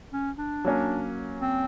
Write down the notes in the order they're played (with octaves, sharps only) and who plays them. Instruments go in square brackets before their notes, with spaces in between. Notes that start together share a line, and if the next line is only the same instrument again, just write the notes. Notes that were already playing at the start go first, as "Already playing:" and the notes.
[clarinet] C#4
D4
[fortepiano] F#3 A#3 C#4
[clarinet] C4